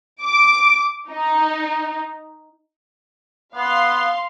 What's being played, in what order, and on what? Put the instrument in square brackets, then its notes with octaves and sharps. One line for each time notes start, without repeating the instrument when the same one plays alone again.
[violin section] D6
D#4
[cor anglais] B3 [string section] F5 C6